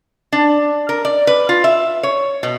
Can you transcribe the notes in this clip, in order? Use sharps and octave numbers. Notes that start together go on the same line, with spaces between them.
D4
A#4
D5
B4
F4
E5
C#5
B2